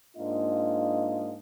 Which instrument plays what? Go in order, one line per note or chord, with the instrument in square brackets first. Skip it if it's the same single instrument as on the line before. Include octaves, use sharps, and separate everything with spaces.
[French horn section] G#2 A#3 D4 F4 D#5